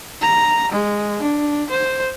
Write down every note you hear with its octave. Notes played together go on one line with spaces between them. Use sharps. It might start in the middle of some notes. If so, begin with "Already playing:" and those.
A#5
G#3
D4
C5